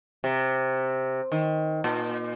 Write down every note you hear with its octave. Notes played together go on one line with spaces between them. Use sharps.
C3
D#3
A#2